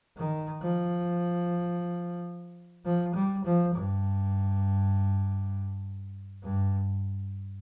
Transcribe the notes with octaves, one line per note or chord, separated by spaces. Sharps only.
D#3
F3
F3
G3
F3
G2
G2